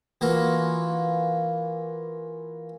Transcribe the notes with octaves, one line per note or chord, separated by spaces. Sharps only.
E3 A#3 F4 F#4